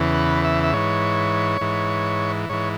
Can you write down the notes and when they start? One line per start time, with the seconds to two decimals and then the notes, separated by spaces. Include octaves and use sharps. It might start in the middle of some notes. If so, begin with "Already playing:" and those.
Already playing: E2 C#3 E3
0.14 B4
0.44 E5
0.63 E5
0.73 G#2 E3 C#5
1.61 G#2 E3
2.49 G#2 E3 C#5